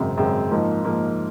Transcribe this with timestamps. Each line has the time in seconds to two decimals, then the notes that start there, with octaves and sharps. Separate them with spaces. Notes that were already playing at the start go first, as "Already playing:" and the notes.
Already playing: G#1 F#2 C#3 G#3 C4
0.17 G#1 F#2 C#3 G#3 C4
0.51 G#2 F3 A#3 D#4
0.83 G#2 F3 A#3 D#4